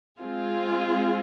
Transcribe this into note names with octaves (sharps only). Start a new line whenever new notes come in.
G#3 C4 F4 G#4